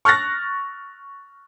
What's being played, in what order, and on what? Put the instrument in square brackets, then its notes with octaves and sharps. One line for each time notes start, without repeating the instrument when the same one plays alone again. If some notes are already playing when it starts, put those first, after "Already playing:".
[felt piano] C#6 F6 F#6 A6 A#6